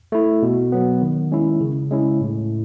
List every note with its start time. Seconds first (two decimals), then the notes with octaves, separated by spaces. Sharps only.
0.12 A3 E4
0.43 B2
0.72 F#3 B3
1.01 D#3
1.32 G#3 C#4 E4
1.61 C#3
1.91 G#3 C#4 E4
2.21 A2